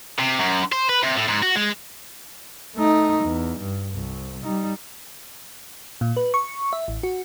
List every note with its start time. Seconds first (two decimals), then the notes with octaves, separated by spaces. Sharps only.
0.19 C3
0.39 F#2
0.72 C5
0.89 B4
1.04 C3
1.16 A2
1.29 G#2
1.43 F#4
1.56 G#3
2.75 A3 D#4
3.24 E2
3.59 G2
3.94 C2
4.43 G3 D#4
6.01 A#2
6.17 B4
6.34 C#6
6.73 E5
6.88 A1
7.03 F#4